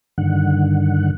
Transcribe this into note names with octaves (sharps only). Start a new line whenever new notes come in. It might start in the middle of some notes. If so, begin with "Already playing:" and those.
G2 D3 D#3 F#5